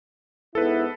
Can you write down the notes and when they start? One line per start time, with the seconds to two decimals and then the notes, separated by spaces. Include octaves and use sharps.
0.55 G#2 B3 E4 A4 B4